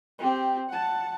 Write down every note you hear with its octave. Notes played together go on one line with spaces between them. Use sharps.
C4 G4
F#5 A5